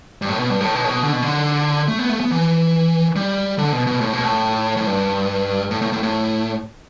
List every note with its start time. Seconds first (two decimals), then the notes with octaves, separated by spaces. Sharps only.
0.22 G2
0.29 A2
0.39 B2
0.50 G2
0.61 A2
0.75 B2
0.84 A2
0.89 B2
1.03 D3
1.13 B2
1.22 D3
1.88 A3
1.99 B3
2.09 A3
2.20 B3
2.31 E3
3.16 G3
3.58 D3
3.73 B2
3.87 B2
4.01 A2
4.13 B2
4.24 A2
4.77 A2
4.87 G2
5.71 A2
5.82 A2
5.93 A2
6.03 A2